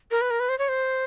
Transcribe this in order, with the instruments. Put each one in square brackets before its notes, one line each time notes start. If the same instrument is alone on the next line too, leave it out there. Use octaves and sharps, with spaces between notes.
[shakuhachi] A#4
B4
A#4
B4
C5
C#5
C5